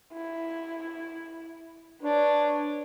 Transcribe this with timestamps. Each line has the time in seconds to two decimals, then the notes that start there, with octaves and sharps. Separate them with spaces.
0.13 E4
2.02 D4 B4 C#5